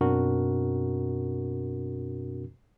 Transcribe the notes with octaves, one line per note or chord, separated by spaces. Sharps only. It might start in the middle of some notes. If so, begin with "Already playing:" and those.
F#2 B2 C4 D4 F#4 A#4